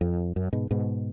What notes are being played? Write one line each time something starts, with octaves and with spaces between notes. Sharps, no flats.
F2
F#2
G#2 B2
G#2 B2